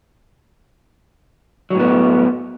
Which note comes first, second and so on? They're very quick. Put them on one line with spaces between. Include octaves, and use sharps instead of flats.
F#3 A2 B3